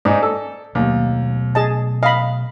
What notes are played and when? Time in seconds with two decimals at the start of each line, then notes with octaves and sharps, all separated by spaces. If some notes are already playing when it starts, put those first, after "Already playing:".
0.05 G#2 D#4 D5
0.23 A4
0.75 D#2 B2 F#3 A3
1.55 G#4 D#5 A5
2.03 D#5 F5 B5